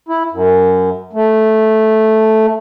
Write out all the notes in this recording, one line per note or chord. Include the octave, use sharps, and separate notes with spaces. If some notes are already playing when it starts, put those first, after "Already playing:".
E4
F#2
A3